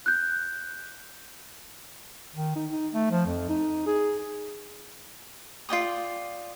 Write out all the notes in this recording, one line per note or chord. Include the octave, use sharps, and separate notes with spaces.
F#6 G6
D#3
D#4
D#4
A3
F3
F2
D#4
G#4
F4 D5 G5 D#6